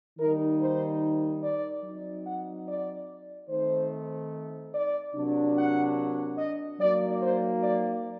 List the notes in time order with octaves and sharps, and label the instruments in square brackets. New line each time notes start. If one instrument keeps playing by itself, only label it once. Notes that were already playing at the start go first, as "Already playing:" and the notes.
[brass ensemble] D#3 G3 A#3 D#4 A#4
C5
D5
F#3 C4 D#4
F#5
D5
D#3 A3 C4 D#4 C5
D5
C3 F#3 A#3 D4
F#5
D#5
F#3 A#3 D#4 D5
C5
D5